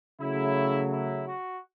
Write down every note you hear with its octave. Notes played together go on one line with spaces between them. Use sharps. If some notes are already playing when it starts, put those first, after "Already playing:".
C#3 F#3 A3 E4
E4
F#4